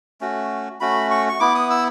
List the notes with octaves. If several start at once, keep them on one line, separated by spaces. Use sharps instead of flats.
A3 C#4 F#4
A3 C#4 F#4 B5
C#6
C#6
B3 E4 D6
D#6
E6